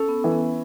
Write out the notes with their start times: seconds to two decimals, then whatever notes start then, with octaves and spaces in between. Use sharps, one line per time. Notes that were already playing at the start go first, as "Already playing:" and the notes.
Already playing: C#4 A4
0.09 B3
0.24 E3
0.32 B3